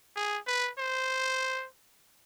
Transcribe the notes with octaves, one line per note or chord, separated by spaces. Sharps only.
G#4
B4
C5